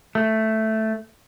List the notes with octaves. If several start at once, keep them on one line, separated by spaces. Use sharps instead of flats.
A3